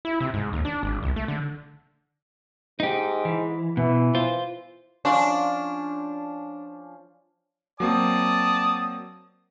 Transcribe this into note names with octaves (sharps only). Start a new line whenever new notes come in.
E4
C3
G#2
D#2
D4
G#1
C2
A3
D3
G#2 D#4 G4
E3
B2 E3
F4 C5
F3 C#4 D4 F4
F#3 A#3 C4 D5 A5 D#6